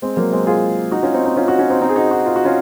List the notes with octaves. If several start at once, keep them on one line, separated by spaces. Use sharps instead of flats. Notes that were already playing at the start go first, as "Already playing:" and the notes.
G#3 C4
F#3 A#3
G#3 C4
F4 G#4
D#4 F#4
C#4 F4
C4 D#4
C4 D#4
C#4 F4
D#4 F#4
C#4 F4
C4 D#4
C4 D#4
G#4
D#4 F#4
D#4 F#4
F4
F#4
C#4 F4